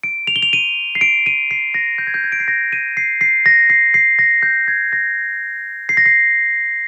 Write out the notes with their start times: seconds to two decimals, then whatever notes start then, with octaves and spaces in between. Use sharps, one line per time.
0.03 D7
0.27 F7
0.36 G7
0.42 F7
0.53 D#7
0.95 C7
1.01 D7
1.26 D#7
1.51 C7
1.74 A#6
1.98 G6
2.07 G#6
2.14 G6
2.24 G#6
2.32 D7
2.40 C7
2.48 A#6
2.73 D#7
2.97 C7
3.21 C7
3.46 A#6
3.70 C7
3.94 C7
4.19 A#6
4.43 G6
4.68 G#6
4.93 A#6
5.89 C7
5.97 A#6
6.06 C7